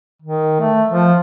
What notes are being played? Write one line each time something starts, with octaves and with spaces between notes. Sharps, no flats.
D#3
A3
F3